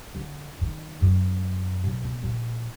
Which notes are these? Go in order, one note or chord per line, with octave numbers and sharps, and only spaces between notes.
D3
D#3
F#2
B1
B2
A#1